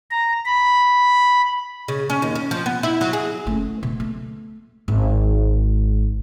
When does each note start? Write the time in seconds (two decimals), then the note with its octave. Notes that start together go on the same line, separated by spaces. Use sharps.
0.11 A#5
0.46 B5
1.88 C#3
2.10 C#4
2.22 D#2
2.35 C#4
2.51 F3
2.66 B3
2.83 E4
3.01 F#3
3.13 G#4
3.47 A3 C#4
3.83 B2
4.00 A3
4.88 G#1